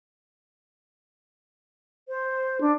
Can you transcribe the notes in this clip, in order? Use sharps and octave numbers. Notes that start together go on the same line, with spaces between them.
C5
D4